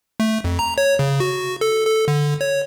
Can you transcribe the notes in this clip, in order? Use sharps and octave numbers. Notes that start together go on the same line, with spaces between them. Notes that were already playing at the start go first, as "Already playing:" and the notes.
A3
F2
A#5
C#5
C#3
F#4
A4
A4
D3
C#5